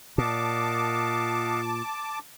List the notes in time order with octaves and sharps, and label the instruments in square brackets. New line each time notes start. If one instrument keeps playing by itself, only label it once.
[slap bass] A#2 [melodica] D#5 F5 F#5 [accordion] A5 D6